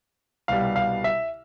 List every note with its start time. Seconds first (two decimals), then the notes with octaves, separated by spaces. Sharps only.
0.48 C2 B2 G3 F5
0.76 F5
1.04 E5